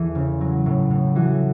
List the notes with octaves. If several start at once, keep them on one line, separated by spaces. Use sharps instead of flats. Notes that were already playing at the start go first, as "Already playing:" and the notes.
Already playing: E2 E3 A4
C#3
F#3
A2
A2
E3 F#4